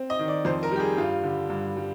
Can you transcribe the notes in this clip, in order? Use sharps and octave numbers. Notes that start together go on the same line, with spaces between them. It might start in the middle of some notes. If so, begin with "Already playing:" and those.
Already playing: C4
D#5
D#3
D5
F2 C5
A#4
G3 G4
G#4
G2 F4
D3
G2
G3